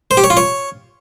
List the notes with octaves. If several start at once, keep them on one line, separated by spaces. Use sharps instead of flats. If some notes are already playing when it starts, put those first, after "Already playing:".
C5
G4
C#5
F4
C#5